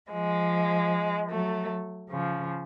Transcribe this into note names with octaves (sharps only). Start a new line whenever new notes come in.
F3 G#3
F#3 A3
C#3 F3